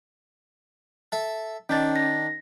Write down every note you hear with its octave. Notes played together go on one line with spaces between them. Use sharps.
A4 E5
D#3 C#4 D4 A6
A#6